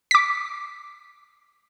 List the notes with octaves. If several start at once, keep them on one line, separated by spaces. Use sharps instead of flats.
D6 B6